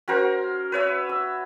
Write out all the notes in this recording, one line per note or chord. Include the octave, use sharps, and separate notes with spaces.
C#4 F#4 A#4 C5
B4 C#5 E5
E6